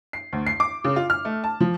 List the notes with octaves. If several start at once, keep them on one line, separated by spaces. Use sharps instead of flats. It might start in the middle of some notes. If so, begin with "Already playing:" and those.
C7
D2
C7
D6
C#3
F4
F6
A3
A5
F3